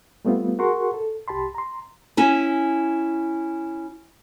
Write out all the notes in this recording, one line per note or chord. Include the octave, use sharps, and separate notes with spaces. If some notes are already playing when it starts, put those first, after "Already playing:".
G3 A3 B3 C4 F4
F#4 G#4 A#4 F#5 C6 C#6
A4
C2 G4 A5 B5 C6
A#5 C6
C#4 E4 G#5